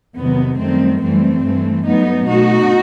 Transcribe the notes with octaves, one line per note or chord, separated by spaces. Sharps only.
E2 C3 D#3 F#3 B3
F#2 D#3 G3 A3 C4
F#2 E3 G3 A3 C4
G2 E3 A3
G2 F#3 A3 B3 D#4
B2 A3 D#4 F#4